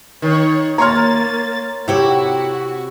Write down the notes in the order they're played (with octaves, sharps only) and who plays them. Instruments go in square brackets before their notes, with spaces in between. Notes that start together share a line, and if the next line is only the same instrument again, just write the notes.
[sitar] D#3 [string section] C#5
[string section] A#3 A6 [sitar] C#5 [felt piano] A#5 C6 F6
[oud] C3 G4 C#5 [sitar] E4 [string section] F#4